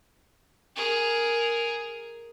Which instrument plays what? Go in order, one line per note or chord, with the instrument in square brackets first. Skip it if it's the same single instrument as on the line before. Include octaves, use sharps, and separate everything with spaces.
[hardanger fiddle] G#4 A#4